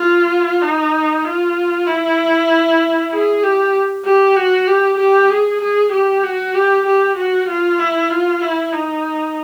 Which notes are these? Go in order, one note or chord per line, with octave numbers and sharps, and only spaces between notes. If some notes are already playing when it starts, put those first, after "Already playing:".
Already playing: F4
D#4
F4
E4
G#4
G4
G4
F#4
G4
G4
G#4
G#4
G4
F#4
G4
G4
F#4
F4
E4
F4
E4
D#4